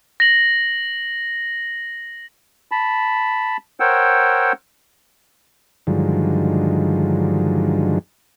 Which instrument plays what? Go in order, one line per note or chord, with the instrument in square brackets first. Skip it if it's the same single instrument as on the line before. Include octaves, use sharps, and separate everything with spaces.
[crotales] A#6 F#7
[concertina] A5 B5
A#4 C5 C#5 F#5 G5 E6
[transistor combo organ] G2 D3 D#3 F3 F#3 G#3